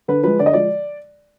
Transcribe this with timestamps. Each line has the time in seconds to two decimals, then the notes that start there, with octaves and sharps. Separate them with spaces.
0.08 D3 B4
0.23 F3 G#3 B4
0.39 D3 D5
0.46 D#5
0.53 F3 G#3 D5